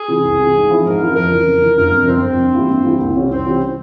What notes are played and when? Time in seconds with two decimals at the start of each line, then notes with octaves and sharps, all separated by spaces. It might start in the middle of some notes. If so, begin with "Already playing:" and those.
Already playing: G#4
0.08 C3 E3
0.23 C2
0.38 C3 E3
0.54 G#2
0.69 F3 C4 E4
0.85 G#2 A#4
1.00 F3 C4 E4
1.15 F2 A#4
1.30 C#3 E3
1.46 F2
1.61 C#3 E3
1.77 G1 A#4
1.92 F2 C3
2.07 G1 C4
2.23 F2 C3
2.38 G2
2.53 E3 G3 A#3 E4
2.68 G2
2.84 E3 G3 A#3 E4
2.99 C2
3.15 C3 E3 G3 C#4
3.30 C2 C4
3.46 C3 E3 G3 C#4